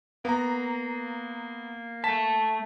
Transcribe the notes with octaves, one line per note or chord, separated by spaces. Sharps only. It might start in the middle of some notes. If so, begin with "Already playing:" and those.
A#3 B3 A#5
A3 A5 B6